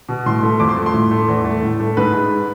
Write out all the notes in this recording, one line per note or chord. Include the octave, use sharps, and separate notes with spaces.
B2
A2 C6
A3
F2 D6
C6
A3
C6
A2
A3
E2
A3
A2
A3
G#2 B4
G#3